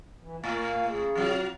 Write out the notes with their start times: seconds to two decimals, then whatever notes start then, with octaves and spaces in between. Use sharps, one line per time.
0.20 E3
0.44 A2 A#3 F5 G#5
0.89 C#3 G#4
1.15 C3 F#3 F4